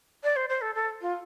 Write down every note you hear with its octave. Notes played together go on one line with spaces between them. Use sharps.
D5
C5
C5
A4
A4
F4